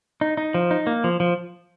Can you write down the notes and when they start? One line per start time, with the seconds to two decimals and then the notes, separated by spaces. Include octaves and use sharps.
0.21 D#4
0.37 D#4
0.54 F3
0.71 D#4
0.87 A#3
1.04 F3
1.20 F3